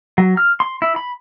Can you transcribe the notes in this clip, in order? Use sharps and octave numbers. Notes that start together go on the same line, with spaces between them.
F#3
F6
C6
E4
B5